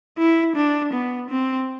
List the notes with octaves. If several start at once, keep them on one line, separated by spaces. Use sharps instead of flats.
E4
D4
B3
C4